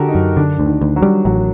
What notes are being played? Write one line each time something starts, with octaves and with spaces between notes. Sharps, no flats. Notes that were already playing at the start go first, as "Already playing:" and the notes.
Already playing: D3 F#4 G4 A4 A#4
D#4
F#2
D3 D4
D2
D#3
D2
F#3
G3
A1 F#3